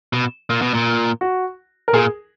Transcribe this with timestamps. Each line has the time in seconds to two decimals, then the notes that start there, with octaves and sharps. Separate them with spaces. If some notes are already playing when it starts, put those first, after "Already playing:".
0.13 B2
0.50 A#2
0.62 B2
0.74 A#2
1.21 F#4
1.88 A#4
1.94 A#2 G#4